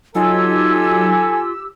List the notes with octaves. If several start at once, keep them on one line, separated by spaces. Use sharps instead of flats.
F#3 D#4 F4 G4 A4 G#5 E6